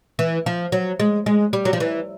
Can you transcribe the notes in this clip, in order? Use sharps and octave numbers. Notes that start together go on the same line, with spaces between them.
E3
F3
F#3
G#3
G#3
G3
F#3
F3
E3